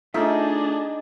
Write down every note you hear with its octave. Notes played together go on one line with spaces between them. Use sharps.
A3 D4 D#4 F4 G#4 E5